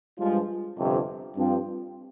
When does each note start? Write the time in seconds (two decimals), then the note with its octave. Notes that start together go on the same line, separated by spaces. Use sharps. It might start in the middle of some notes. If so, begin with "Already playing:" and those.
0.19 G2 F3 G#3
0.78 G1 F2 C3
1.36 G2 F3 C4